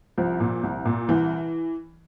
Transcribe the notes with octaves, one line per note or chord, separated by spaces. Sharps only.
C2 F3
A#2
C2
A#2
C2 E3